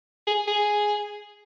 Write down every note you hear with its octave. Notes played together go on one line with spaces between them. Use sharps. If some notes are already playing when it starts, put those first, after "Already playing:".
G#4
G#4